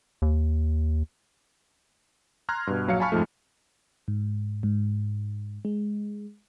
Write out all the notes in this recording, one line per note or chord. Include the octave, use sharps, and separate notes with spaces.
D#2
A#5 C6 F6 F#6 G#6
G2 B2
A#1 F#3 F5 C#7
F5 G#5 A5 B5 C#6 F6
F2 G#2 F3 A3
G#2
G#2
G#3